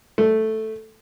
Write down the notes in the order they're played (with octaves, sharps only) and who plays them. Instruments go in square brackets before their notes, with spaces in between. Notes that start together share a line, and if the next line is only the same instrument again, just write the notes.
[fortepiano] A3